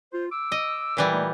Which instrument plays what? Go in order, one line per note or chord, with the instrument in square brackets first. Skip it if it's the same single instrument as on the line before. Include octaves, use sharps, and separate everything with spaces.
[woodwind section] F4 C5
D6 E6
[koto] D#5
A#2 E3 G3
[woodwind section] A3 D#4